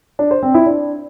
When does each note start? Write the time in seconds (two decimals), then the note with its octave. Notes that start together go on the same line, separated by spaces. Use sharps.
0.19 D4
0.31 C5
0.43 C4
0.54 E4
0.66 D4